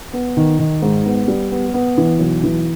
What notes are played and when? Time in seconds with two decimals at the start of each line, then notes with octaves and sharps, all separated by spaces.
0.13 B3
0.37 D#3
0.59 D#3
0.82 G#2
1.06 B3
1.28 G3
1.52 B3
1.74 B3
1.98 E3
2.19 B1
2.43 E3